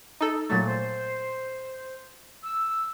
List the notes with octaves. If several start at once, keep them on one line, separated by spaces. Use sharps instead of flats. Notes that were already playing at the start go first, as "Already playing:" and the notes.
D#4 A4
A#2 F#3 A3 A6
C5
E6